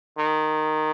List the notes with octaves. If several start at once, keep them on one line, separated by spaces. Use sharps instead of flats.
D#3